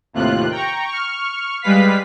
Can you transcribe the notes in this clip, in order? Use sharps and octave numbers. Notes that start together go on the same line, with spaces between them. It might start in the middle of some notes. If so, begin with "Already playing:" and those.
D#2 A2 C3 F4 F#6
G5 A#5 C#6
C#6 F6
G3 G#3 B4 F5 B6